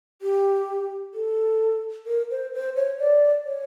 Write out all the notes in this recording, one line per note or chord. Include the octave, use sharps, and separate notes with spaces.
G4
A4
A#4
C5
C5
C#5
D5
C#5